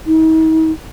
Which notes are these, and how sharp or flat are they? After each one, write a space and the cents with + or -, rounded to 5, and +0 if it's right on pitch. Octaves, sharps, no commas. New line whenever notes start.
D#4 +45